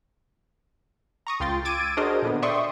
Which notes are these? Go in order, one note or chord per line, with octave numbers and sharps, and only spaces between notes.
A#5 C#6 D#6
C#2 F4 G5 C6 A6
D6 E6 G#6 A6 D7 D#7
D4 F#4 G#4 A#4 C5 D#5
A#2 D3 B3
D5 E5 G5 C6 C#6 D#6